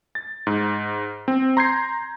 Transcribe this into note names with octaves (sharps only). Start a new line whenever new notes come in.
A6
G#2
C4
A#5 C6 G6 G#6 C7